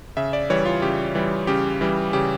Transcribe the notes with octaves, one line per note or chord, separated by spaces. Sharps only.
C#3 E5
D5
E3 G3 C#5
F4
C#3 G4
E3 G3
C#3 G4
E3 G3
C#3 G4